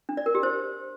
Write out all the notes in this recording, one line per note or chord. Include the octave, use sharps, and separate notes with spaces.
D4
D5
A#4
G4
C5